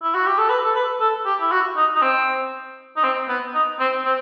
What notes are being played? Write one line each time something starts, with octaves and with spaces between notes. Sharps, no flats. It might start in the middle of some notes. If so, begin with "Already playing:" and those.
E4
F#4
G4
A4
B4
A4
B4
A4
G4
E4
F#4
D#4
D#4
C4
D#4
C4
B3
D#4
C4
C4